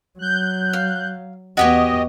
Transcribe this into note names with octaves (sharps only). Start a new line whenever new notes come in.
F#3 F#6 G6
F5
E2 B3 F#4 G4 C#5 D#5